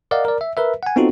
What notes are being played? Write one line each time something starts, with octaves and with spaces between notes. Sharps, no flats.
A#4 D5 D#5 F5 F#5
A#4 D5
E5
A#4 B4 E5
F#5 G#5
B3 C4 D#4 F4 F#4 A4